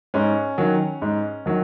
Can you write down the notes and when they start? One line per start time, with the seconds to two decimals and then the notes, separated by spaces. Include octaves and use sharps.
0.14 G#2 C#4
0.58 D#3 F#3
1.02 G#2
1.46 D#3 F#3